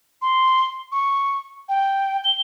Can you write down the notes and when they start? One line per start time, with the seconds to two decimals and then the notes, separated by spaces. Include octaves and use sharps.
0.22 C6
0.92 C#6
1.69 G5
2.24 G7